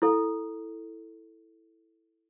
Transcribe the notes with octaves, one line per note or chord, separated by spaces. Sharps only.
E4 A4